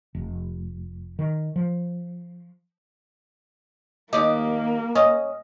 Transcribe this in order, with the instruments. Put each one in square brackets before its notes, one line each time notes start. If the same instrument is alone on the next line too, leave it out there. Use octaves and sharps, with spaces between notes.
[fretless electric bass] F1
D#3
F3
[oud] D#2 D#5 [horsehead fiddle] A#3 [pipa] G4
[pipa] C#4 [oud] D#5